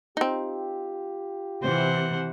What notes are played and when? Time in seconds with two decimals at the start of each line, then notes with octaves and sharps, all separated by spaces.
0.17 C4 D#4 F4 G4
1.62 C3 E3 C5 F#5